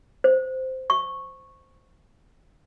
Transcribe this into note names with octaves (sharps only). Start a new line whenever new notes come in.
C5
C#6